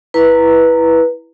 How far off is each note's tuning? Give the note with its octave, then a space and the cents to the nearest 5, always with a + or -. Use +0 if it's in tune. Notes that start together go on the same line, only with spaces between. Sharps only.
E4 +0 B4 -10 A#5 -15